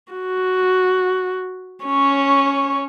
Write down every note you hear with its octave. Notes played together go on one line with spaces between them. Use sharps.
F#4
C#4 C#5